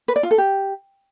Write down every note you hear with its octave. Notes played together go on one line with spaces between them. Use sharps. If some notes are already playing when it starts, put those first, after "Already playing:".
B4
D5
F4
A4
G4